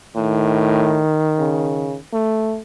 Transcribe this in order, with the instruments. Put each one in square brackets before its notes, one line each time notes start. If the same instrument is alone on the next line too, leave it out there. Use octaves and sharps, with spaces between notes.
[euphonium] A2 [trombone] D#3
[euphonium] C#3
A3